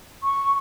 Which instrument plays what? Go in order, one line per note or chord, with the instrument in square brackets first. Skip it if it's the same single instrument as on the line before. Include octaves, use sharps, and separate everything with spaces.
[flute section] C#6